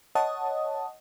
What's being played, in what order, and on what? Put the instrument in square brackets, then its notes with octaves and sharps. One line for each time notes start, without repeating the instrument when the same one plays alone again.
[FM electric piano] C#5 D#5 F#5 A5 D#6